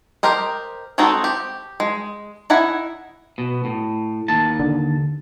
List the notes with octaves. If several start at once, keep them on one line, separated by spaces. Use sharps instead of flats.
G4 A#4 C5 D#5
G#3 C4 D#4 F#4 A4
G4
G#3
D#4 E4 F#5 G#5
B2
A2
D#2 A5
D3